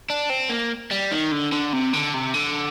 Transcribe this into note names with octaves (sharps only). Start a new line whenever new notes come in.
D4
C4
A#3
G3
D#3
D3
D3
C3
D3
C3
D3